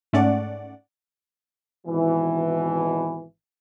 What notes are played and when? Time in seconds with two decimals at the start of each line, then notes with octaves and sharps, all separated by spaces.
0.13 G#2 A3 C#4 D5 F#5
1.87 G#1 B2 E3